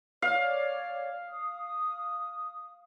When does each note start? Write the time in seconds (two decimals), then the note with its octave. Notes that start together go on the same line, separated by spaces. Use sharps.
0.22 C#5 D5 F5
1.29 D#6